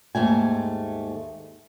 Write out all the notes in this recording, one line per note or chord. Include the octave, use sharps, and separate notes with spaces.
D#2 G#2 A3 G#5